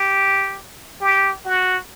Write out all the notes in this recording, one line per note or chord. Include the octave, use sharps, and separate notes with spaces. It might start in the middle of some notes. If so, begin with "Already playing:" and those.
Already playing: G4
G4
F#4